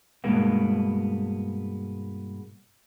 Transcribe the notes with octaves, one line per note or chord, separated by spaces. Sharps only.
G2 B2 G#3 A#3 B3